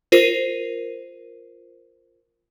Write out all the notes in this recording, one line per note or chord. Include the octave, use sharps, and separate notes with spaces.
F4 A#4 C5 C7 D#7